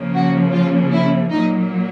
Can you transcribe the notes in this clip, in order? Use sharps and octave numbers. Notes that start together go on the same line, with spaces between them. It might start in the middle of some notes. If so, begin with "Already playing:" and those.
Already playing: C#3 F3 A#3
F#4
F4
E4
A#2 F#3 A#3 D#4